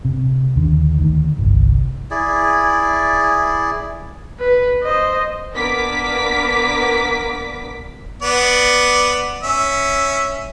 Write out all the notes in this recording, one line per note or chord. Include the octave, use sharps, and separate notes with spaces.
C3
D#2 D3
D2 D#3
G1 C2
E4 G#4 D5
B4
C5 D#5
A#3 B3 D4 A#4 D6 B6
B3 D5
C#4 E5